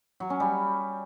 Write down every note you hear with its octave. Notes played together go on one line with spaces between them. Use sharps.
F#3
C#4
G3